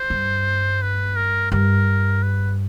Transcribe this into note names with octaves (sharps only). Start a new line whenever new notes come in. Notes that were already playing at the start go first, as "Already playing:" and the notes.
Already playing: C5
G2
B4
A#4
G2 A#4
B4